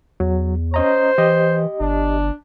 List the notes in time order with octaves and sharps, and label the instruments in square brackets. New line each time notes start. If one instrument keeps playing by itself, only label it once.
[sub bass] E2 [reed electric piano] F#3
[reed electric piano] C#4 D#5 A#5 [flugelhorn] C5
[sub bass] E3 [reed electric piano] G4 D#5
[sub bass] G1 [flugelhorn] D4